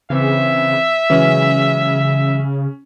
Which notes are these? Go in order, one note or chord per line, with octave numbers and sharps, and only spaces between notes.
C#3 E3 C4 E5
C#3 E3 F#3 G#3 C#4